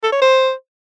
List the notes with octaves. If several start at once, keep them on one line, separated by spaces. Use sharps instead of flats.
A4
C#5
C5